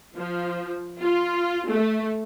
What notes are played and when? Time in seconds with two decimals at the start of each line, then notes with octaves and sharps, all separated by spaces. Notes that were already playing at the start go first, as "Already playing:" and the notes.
0.16 F3
1.01 F4
1.70 A3